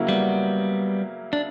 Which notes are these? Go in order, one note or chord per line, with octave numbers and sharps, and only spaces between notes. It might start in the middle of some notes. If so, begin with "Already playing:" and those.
Already playing: C#3 F#3 A#3 E4
G3 B3
D4